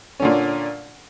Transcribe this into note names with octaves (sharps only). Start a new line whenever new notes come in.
A#2 D3 C#4